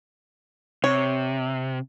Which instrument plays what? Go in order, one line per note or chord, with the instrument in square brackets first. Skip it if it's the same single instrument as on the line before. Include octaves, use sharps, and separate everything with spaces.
[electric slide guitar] C3 [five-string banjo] C#5